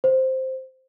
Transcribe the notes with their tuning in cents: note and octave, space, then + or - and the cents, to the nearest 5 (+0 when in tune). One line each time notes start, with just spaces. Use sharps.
C5 +0